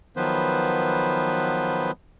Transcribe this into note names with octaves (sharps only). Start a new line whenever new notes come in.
D#3 F3 F#3 B3 B4 C5